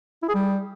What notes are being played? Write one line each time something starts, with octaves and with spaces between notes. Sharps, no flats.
E4
G#4
G3